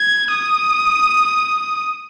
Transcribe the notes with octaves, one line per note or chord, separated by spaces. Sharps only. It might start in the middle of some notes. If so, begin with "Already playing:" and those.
Already playing: G#6
D#6